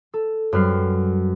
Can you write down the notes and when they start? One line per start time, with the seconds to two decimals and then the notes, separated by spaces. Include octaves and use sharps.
0.14 A4
0.53 F#2 G3 B4 F6 C7